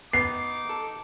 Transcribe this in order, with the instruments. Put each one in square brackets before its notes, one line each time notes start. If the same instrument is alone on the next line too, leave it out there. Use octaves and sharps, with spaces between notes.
[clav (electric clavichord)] B3 [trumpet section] D#4 D6 [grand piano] C7
[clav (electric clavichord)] A4